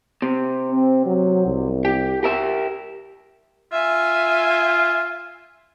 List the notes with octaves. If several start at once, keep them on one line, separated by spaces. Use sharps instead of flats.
C3
C4
F#3
C2
G4
G4 A#4 E5
F4 E5 G#5